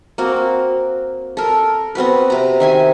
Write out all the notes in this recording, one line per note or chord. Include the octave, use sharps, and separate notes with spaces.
A#3 C4 F#4
A4 A#4
B3 C4 F#4 B4
C3 A#5
D#3 E5 G#5